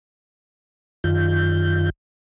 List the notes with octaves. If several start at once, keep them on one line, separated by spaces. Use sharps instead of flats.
F#2 D#3 F4 G6